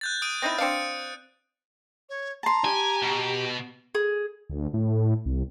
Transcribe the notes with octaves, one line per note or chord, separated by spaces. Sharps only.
F#6 G6 A6
D#6 D7 D#7
C4 D#4 E4
C4 D4 F5 G6 C#7
C#5
A5 A#5 C6
G4 G#5
B2
G#4
D2
A2
C2